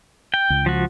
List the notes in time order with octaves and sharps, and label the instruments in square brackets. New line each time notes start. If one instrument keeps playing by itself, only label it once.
[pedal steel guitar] G5
[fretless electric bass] C#2
[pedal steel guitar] F3 F#4